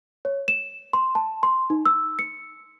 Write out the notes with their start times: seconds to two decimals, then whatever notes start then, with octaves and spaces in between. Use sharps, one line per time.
0.25 C#5
0.48 E7
0.93 C6
1.15 A5
1.43 C6
1.70 D#4
1.86 E6
2.19 C#7